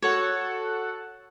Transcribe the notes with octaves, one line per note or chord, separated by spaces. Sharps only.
F#4 A4 C#5 F#5